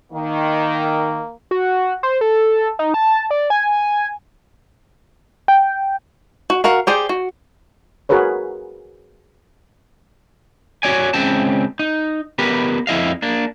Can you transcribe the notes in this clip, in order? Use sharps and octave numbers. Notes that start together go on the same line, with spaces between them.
D#3 A#3
F#4
C5
A4
D#4
A5
D5
G#5
G5
F#4
F#4 A#4 F5 F#5
G4 G#4 C5 D5
F#4
F#4 G#4 A#4 B4 C#5
F#4 C#5 D5 G#5
C#2 C#3 C4 A5
D#4
B3 G4 A#4 B4
F2 E4 D#5 F5
A#3 D4